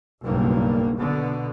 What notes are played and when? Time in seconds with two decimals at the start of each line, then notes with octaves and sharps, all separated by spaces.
0.23 F#1 B1 G2 A#3
0.99 B2 D3